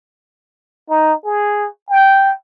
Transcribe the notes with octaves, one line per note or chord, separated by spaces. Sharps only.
D#4
G#4
G5